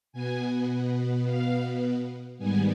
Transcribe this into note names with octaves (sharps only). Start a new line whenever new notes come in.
B2 B3 G#5
F5
G#2 D#3 G3 B3 G#5